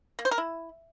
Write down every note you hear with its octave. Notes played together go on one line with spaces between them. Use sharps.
A#3
C5
A#4
E4